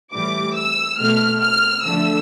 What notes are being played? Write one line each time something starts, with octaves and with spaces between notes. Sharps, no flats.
A2 E3 G3 D6
E6
B2 A3 F6
F6
D3 F3 A3 E6